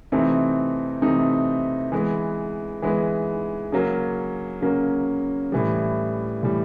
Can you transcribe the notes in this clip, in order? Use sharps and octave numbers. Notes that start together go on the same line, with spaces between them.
C3 E3 A3 C4 D#4
C3 E3 A3 C4 D#4
E3 G#3 B3
E3 G#3 B3
C#3 F#3 A#3 C#4
C#3 F#3 A#3 C#4
A2 E3 G3
A2 E3 G3